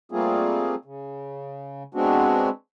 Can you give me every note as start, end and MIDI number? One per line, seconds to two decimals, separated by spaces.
0.12 0.75 55
0.12 0.75 57
0.12 0.75 58
0.12 0.75 60
0.12 0.75 65
0.12 0.75 68
0.85 1.83 49
1.94 2.49 56
1.94 2.49 59
1.94 2.49 60
1.94 2.49 62
1.94 2.49 66